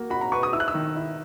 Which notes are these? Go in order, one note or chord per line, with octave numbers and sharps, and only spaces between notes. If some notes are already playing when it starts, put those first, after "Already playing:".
Already playing: A#3 F#4
F#4 B5
A#5
B4 C#6
D#6
E4 E6
F#6
E6
D#3
E4